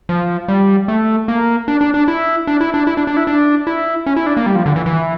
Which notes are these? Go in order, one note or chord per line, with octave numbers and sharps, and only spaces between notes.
F3
G3
A3
A#3
D4
D4
D4
E4
D4
E4
D4
E4
D4
D4
E4
D4
E4
C#4
E4
D4
A#3
G3
F3
D3
E3
E3